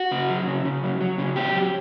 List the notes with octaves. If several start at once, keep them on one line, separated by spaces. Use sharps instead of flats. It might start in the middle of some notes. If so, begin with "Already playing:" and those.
Already playing: F#4
C#3
F#3
C#3
C#3
F#3
F#3
C#3
F#3 G4
F#3